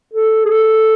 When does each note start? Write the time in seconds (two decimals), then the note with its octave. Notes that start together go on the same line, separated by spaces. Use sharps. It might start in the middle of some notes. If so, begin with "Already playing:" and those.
0.14 A4
0.45 G#4
0.49 A4